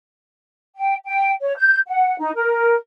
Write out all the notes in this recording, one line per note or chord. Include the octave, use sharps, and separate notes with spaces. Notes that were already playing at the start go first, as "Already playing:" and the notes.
G5
G5
C#5
G6
F#5
D#4
A#4